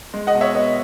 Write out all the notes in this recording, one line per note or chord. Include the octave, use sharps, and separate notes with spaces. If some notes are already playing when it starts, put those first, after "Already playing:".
G#3
D#5 F#5
B2
C#5 E5
B3 D#5